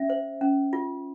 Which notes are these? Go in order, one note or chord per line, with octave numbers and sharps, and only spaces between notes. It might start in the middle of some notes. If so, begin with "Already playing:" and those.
Already playing: C#4 E5
C5
C#4
F4